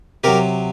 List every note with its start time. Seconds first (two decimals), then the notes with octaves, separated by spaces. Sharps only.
0.24 C3 F#3 G4 A#4